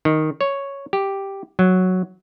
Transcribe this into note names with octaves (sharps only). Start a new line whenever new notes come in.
D#3
C#5
G4
F#3